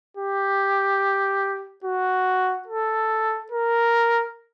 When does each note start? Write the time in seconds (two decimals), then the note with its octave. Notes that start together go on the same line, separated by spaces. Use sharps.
0.17 G4
1.84 F#4
2.68 A4
3.52 A#4